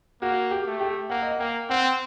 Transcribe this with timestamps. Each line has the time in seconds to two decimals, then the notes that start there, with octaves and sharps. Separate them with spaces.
0.22 A#3 F#4
0.51 G4
0.66 A3
0.81 G4
1.10 A#3 F#5
1.22 D#5
1.31 F#5
1.39 A#3 G5
1.70 C4 F#5